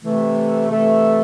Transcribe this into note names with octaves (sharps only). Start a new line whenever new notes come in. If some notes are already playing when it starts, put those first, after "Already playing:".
C3 E3 A3
C3 E3 A3